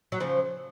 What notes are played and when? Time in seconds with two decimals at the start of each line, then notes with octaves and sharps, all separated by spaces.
0.12 F#3
0.20 C#3 F3